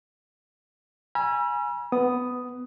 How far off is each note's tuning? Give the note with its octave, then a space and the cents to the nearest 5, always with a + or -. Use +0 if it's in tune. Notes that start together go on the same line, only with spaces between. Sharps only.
G#5 +0 B5 -45 E6 +40
B3 +10 D#6 +0